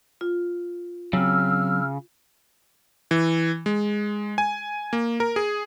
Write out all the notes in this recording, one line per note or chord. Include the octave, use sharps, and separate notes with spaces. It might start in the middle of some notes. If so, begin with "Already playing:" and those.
F4
C#3 F#3 C4 E6 F6
E3
G#3
G#5
A#3
A#4
G#4